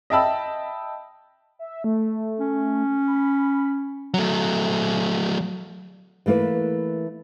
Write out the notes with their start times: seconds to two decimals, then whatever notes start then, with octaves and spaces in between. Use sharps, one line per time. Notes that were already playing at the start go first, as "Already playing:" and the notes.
0.10 D#5 E5 G5 A5 B5 E6
1.59 E5
1.84 A3
2.40 C#4
3.07 B5
4.14 F#3 A3
6.26 E3 A3 A#3 E4 B4